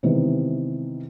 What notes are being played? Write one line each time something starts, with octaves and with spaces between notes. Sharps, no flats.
C3 D#3 E3 G#3 B3